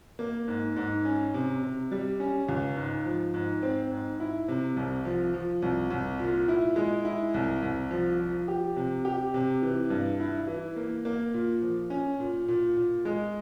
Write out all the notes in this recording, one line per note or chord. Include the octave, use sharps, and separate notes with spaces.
A#3
G#2
G#2
C#4
C3
C3
G3
C#4
C#2
G#2
F3
G#2
C4
G#2
E4
C3
C2
F3
F3
C2
C2
A#2
E4
G#3
E4
C2
C2
F3
F3
G4
C3
G4
C3
E3
G2
E4
E3
A#3
A#3
A#2
F3
C#4
A#2
A#2
A#2
G#3